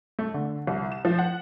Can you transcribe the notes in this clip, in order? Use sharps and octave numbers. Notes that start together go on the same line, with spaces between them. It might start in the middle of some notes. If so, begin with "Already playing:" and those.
A3
D3
C2
E7
F3
F#5